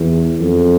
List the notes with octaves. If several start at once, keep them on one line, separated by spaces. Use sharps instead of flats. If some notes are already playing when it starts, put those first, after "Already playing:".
Already playing: E2
F2